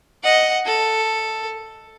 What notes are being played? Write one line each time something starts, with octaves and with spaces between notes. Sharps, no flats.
D#5 F#5
A4